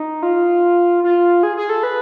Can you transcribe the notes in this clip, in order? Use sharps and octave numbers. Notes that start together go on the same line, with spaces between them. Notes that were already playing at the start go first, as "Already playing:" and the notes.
Already playing: D#4
F4
F4
G#4
G#4
A4
B4